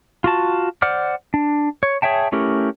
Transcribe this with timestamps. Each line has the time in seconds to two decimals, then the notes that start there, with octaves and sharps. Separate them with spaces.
0.24 F4 F#4 A5
0.82 C5 D5 F#5 D6 F6
1.34 D4
1.83 C#5
2.02 G#4 C#5 E5 G5 A5
2.32 A3 C#4 E4 G4 A#4